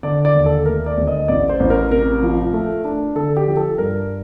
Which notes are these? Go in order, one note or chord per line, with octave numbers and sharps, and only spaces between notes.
D3 D5
D5
D#2
A4
A3 A#4
D5
D2
D#5
A1 D5
C5
A1
A#4
C3 A#4
F3
A3
D4
D3 A4
G4
F3
A4
G2 A#4